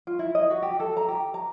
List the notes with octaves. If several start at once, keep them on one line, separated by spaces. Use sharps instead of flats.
F4
E4
D#5
F#4
G4
A4
A#5
G4
A#5